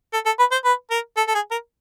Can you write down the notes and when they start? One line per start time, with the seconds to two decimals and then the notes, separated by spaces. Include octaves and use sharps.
0.13 A4
0.26 A4
0.39 B4
0.52 C5
0.65 B4
0.91 A#4
1.17 A4
1.28 A4
1.35 G#4
1.51 A#4